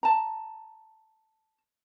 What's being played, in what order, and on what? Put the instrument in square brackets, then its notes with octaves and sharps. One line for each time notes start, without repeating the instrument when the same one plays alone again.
[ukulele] A5 A#5